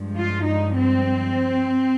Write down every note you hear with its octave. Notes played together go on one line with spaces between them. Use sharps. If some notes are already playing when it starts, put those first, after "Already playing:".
Already playing: G2 F3 G#3
F4
D#4
C4